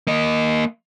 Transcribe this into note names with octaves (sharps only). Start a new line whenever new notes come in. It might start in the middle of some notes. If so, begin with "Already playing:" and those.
A#3 D#5